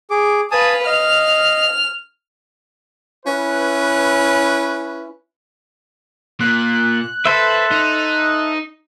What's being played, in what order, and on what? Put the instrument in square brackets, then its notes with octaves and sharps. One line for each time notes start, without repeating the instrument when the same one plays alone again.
[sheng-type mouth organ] G#4 D6
[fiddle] B4 F5 [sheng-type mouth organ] G#5 A5 D#6
[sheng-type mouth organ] D#5 F5 [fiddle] F6
[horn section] C#4 E4 B4
[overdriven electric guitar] A#2 [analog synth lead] F#6
[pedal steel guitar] A4 C5 E5 [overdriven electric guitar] B4
[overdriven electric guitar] D#4